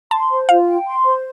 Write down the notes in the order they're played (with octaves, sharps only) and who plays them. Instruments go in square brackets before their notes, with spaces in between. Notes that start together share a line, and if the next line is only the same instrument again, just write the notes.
[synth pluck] A5 [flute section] C6
[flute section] C5
[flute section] F4 [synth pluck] F5
[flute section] G5
C6
C5